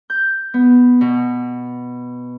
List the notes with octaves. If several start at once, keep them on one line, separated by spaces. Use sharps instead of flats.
G6
B3
B2